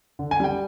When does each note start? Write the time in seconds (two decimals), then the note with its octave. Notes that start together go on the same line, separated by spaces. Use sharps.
0.19 D3
0.31 G#5
0.40 G3 G5